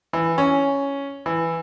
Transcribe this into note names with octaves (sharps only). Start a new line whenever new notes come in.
E3
C#4
E3